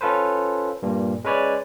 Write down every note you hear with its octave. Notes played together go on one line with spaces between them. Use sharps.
C#4 F4 A4 B4 C5
G2 A#2
G#3 C#4 B4 C#5 D5 G#5